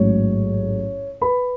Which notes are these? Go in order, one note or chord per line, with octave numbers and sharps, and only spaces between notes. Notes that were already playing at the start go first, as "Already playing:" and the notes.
Already playing: A1 G#2 F#3 C#5
B4 B5